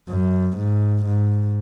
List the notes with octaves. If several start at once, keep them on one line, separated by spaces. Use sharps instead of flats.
F#2
G#2
G#2